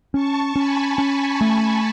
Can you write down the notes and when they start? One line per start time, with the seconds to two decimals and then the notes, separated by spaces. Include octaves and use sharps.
0.14 C#4 A5 C#6
0.56 C#4 G#5 B5
0.98 C#4 A5 C#6
1.41 A3 G#5 B5